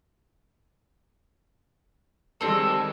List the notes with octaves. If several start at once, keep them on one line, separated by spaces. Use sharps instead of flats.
D#3 G3 G#3 C4 A4